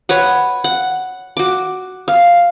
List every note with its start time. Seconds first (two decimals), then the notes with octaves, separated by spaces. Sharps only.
0.09 B4 C#5 F#5
0.64 F#5
1.37 F#4 D6
2.08 F5